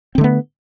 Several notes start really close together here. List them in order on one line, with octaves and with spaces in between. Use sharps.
C4 D3 A3 B3